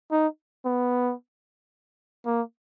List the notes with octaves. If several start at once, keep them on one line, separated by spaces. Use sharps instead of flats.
D#4
B3
A#3